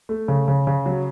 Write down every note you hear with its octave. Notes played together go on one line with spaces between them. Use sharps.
A3
C#3
C#3
C#3
F#3